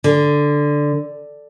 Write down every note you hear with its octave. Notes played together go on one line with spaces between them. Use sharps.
D3